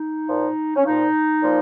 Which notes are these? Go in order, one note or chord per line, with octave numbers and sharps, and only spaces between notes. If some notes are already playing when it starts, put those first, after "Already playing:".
Already playing: D#4
A#2 F3
C#4
A#2 F3 D#4
A#2 F3